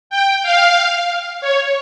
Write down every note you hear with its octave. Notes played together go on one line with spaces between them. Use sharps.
G5
F5
C#5